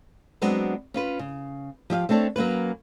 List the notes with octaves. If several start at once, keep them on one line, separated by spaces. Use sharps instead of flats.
F#3 G#3 B3 C4 D4 F#4
C#4 F4 B4
C#3
F3 G4 E5 F5
A3 C4 D4 A4 C#5
F#3 A#3 C#4 B4